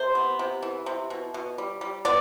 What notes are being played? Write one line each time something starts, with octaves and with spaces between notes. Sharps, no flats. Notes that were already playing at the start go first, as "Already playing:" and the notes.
Already playing: C3 C5
B3
C3
E3
C3
B2
B2
G3
G3
B3 D5